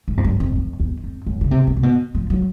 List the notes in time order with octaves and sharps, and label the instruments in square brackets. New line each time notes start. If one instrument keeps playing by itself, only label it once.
[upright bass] G#2
F2
F#2
F2
F2
E2
F2
F#2
C#3
C3
B2
C3
B2
F3
F#3